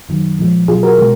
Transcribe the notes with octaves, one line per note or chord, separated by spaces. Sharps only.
F#2 D#3 F#3
A#2 F3 G#3
B2 F#3 F4 G#4
F#4 A#4
B2 G#3